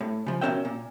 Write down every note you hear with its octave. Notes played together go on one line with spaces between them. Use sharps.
A2
C#3 F3
B2 G#3 C#4 A#4 E5 G5
A#2